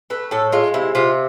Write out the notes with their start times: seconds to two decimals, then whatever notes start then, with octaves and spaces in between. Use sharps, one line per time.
0.10 A3 B4
0.31 A2 A4
0.52 G#3 F4
0.74 C3 E4
0.95 C3 F4